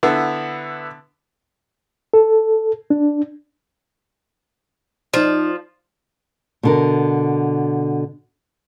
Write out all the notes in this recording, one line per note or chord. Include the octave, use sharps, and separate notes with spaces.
D3 B3 E4
A4
D4
F3 D#4 D5
B2 D3 A#4